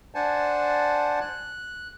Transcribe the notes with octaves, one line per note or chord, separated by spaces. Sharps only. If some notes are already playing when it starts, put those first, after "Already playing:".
D4 C5 D5 F#5 G#5 A5
F#6